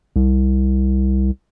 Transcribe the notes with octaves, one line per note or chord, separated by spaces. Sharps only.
C2